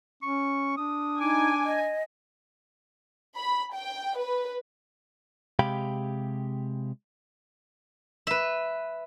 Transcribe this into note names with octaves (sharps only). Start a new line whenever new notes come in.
C#4 C#6
D4 D#6
D#4 G#5 D6
D#5
B5
G5
B4
C3 G#3 G4 F5 G5 B5
B4 E5